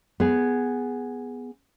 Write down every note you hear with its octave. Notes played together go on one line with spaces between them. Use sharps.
B3 G#4